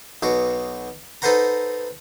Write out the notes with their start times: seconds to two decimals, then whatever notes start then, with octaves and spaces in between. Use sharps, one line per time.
0.23 B1 B2 F#4
1.22 D#4 A4 B4 C5 F#5 A#5